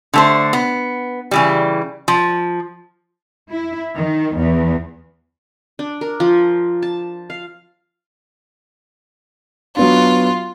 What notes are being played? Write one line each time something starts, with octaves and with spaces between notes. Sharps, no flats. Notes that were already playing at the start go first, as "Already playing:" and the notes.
D3 A3 C5
B3
C#3 E3 G3
F3
E4
D#3
E2
D4
A#4
F3
A5
F5
F#3 B3 D4 F4